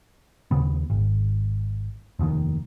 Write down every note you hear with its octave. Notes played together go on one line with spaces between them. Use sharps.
D#2 C#3 B3
G#1
F1 D#2 C3 D#3